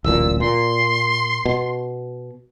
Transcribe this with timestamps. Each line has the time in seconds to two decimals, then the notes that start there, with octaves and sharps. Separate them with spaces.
0.04 D1 A1 A#2 E6
0.40 A#2 C6
1.46 B2